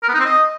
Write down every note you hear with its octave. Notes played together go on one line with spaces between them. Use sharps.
A#4
B3
D#4
C4
D#5